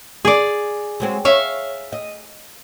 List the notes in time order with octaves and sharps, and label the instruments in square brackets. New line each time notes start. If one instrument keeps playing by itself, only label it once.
[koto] G#4 D5
[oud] F#3 G#3 C4
[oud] C#5 [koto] E5 F5
[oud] D#5